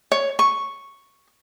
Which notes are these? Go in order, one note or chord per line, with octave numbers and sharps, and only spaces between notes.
C#5
C#6